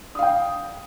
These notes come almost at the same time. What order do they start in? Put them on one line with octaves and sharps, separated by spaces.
D#6 F5 G5